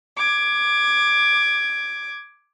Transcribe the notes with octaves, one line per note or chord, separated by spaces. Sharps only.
D6 G#6